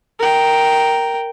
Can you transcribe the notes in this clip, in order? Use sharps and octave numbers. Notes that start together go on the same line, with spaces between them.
A#4 G5